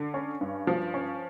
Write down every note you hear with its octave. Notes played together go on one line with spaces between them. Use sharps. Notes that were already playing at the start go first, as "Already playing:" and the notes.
Already playing: D3
C#4
G2
F3
C#4